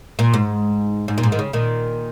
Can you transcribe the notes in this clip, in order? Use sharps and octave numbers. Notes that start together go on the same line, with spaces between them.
A#2
G#2
G#2
A#2
G#2
D#3
C#3
A#2 D#3